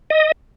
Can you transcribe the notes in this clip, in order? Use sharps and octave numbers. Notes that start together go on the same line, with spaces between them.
D#5